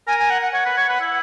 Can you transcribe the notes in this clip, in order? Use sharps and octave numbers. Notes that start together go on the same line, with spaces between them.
A#4 G#5
G#5
F#5
F#5
C#5 F#5
B4
C#5
B4
E4